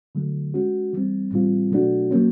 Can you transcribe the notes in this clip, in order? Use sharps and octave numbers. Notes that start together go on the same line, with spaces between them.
D3 F#3 A3
G#3 C#4 F#4
E3 G3 C4
A2 E3 G3 C4 F4
B2 F#3 A3 D4 F#4
F#3 A#3 C#4